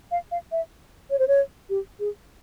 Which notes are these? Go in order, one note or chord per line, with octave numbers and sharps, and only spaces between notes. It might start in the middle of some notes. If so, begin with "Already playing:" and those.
F5
F5
E5
C#5
C5
C#5
G4
G#4